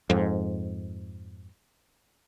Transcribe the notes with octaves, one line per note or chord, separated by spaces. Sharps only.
F2 G#2